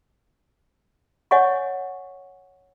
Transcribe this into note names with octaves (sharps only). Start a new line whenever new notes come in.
C#5 D#5 F#5 G#5 C#6